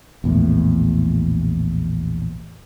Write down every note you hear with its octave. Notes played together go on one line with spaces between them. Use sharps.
A#1 E2 A2